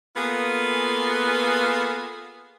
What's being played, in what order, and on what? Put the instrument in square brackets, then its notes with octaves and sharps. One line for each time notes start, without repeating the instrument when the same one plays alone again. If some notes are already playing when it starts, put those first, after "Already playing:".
[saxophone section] A#3 B3 F4 G#4 A4 B4